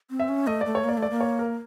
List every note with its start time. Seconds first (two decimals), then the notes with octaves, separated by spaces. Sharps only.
0.10 C4
0.19 E5
0.29 C#4
0.47 A3 D#5
0.61 A3 D5
0.75 C#5
0.84 A#3 D5
0.97 A3
1.02 D5
1.11 A#3
1.21 C#5
1.39 A#4